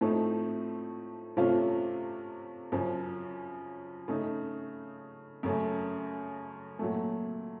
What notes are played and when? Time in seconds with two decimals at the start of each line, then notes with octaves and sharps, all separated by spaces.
0.01 A2 F3 A3 C4 D#4
1.37 C3 F3 A3 C#4 F4
2.72 F#2 C#3 F3
4.08 C#3 A3 D#4
5.43 F#2 C#3 A3
6.79 A#2 F#3 A3